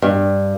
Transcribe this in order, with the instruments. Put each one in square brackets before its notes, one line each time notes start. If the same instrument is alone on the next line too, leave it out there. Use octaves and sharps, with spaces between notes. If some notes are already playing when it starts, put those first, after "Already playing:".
[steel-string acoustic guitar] G2